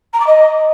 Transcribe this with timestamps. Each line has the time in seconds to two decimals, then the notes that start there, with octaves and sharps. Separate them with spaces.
0.13 A#5
0.20 D6
0.26 D#5